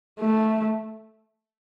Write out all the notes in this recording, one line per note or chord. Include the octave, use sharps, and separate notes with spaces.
A3